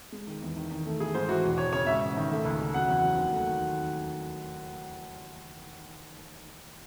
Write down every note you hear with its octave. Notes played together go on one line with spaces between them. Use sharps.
G#3
D#3
E2
D#3
D#3
A3
E3 G#4
G#2 C5
E3 F#4
E1
E1 C#5
C#3 C#5
G#2 E5
A1
D#3
A3
C#2
C#3
F#3 F#5
E2
F#3
D#2
A3
D#3